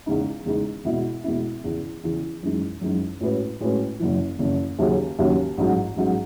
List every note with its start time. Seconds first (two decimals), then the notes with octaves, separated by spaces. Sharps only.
0.06 E2 C#3 G#3 D#4
0.45 E2 C#3 G#3 D#4
0.84 E2 B2 G#3 B3 E4
1.24 E2 B2 G#3 B3 E4
1.64 E2 C#3 E3
2.03 E2 C#3 E3
2.43 F#2 E3 G#3 D#4
2.81 F#2 E3 G#3 D#4
3.21 A2 G#3 C#4 F#4 B4
3.60 A2 G#3 C#4 F#4 B4
3.99 F#1 F#2 E3
4.39 F#1 F#2 E3
4.78 D#2 C#3 F#3 C#4 G#4
5.18 D#2 C#3 F#3 C#4 G#4
5.57 A1 G#2 F#3
5.96 A1 G#2 F#3